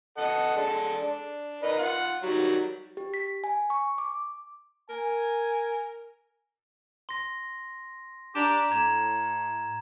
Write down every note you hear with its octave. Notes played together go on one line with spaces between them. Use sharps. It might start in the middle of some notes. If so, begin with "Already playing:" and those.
A4 D#5 F#5
G#3 D4 A4
D4
D#4 A#4 B4
F4 F#5
D#3 F#3 G3
G4
B6
G#5
C#6
D6
A#4 G#5
C6 A#6
D4 G4 A#5 E7
A2 A#5 G#6 E7